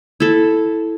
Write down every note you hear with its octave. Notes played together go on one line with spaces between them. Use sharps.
E4 A4